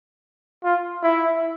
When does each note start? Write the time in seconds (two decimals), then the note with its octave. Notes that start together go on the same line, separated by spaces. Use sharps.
0.64 F4
1.02 E4